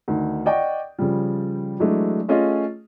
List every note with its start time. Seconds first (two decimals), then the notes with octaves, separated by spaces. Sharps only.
0.08 D2 D#3
0.46 D5 D#5 F#5 G5 C#6
0.99 C#3 F3 G3
1.79 E3 F#3 G#3 A3 D4
2.28 A3 C#4 F4 G#4 D#5